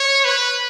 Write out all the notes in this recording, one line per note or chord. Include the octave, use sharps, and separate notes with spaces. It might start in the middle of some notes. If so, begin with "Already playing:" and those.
Already playing: C#5
B4